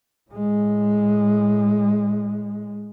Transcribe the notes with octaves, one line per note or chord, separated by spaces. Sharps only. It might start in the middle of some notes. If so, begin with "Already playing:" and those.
A2 G#3